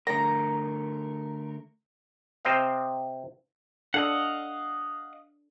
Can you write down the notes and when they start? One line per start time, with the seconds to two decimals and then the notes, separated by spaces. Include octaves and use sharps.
0.07 D3 A3 A#4 A#5
2.45 C3 C4 C5 D#5 F5
3.94 D4 A4 D#5 F5 F#5